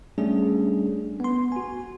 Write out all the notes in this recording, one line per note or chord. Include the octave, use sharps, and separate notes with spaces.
G3 A3 C#4 D4 G#4
B3 C6
F#4 G#5